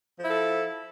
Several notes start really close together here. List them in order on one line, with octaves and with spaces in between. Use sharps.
F3 E4 A4